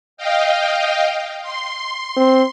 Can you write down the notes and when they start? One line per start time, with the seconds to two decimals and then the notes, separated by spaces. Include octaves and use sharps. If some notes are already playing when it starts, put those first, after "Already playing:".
0.17 D#5 F5 G5
1.42 C6
2.17 C4